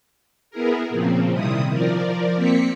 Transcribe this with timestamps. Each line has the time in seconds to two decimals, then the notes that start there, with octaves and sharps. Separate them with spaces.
0.51 B3 E4 G#4 A#4
0.90 A#2 C#3 F3 C4
1.32 C3 D#3 G3 E4 D#6
1.70 F3 A#4 D5
2.35 A#3 C4 B6 C#7